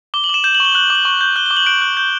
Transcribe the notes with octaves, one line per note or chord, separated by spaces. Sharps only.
D6 G7
F#7
D6 E7
G6 E7
F#7
C#6 G7
F#6 F#7
D6
F#7
C#6
G6
F#6 G7
G7
D6
F#7
F#6 D7
F#6
G6